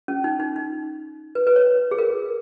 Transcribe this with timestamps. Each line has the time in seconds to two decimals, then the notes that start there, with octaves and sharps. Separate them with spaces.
0.08 C#4
0.24 D#4
0.40 D#4
0.56 D#4
1.35 B4
1.47 B4
1.56 C#5
1.91 G#4
1.98 A#4